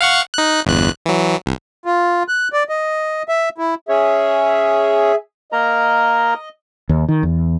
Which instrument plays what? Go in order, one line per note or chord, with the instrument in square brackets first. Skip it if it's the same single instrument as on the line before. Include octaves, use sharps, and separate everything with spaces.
[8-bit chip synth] F5 F#5 C#6
D#4 F#6
G1 E2 F#6
E3 F#3
C2
[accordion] F4
F#6
D5
D#5
E5
E4
[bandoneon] C#4 C#5 [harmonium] G#4 E5
[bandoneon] A#3 A#4 A#5 [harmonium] D#5
[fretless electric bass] D#2
D#3
E2